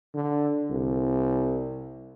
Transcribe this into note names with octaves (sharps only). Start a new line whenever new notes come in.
D3
C2